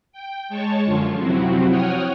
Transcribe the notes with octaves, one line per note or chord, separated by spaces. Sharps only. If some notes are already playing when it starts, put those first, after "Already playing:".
G5
G#3 C#5 A5 C#6
F#2 D3 F3 F4
C3 F3 F#3 C4 E4 F#4
C#5 F#5 G5 D#6 F6